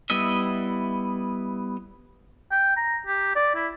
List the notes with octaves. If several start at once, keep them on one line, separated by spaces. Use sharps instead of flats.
G3 B3 E4 D#5 E5
G5
A#5
G4
D5
E4